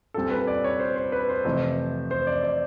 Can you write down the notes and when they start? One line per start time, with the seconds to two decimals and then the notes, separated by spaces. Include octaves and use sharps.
0.14 A#2 G3 C4 A4
0.31 B4
0.47 D5
0.64 C#5
0.80 C5
0.96 C5
1.12 B4
1.29 C5
1.45 F2 C3 E3 A3
2.11 C5
2.27 D5
2.43 D5